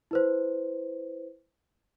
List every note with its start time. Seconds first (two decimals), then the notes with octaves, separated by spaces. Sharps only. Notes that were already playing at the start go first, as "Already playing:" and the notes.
0.11 E4 B4 C5